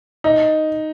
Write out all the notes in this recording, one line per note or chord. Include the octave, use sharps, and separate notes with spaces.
D#4